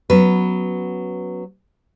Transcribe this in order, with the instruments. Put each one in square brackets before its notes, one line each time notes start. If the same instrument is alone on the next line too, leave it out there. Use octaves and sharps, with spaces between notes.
[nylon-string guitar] F#3 B3 C#4 B4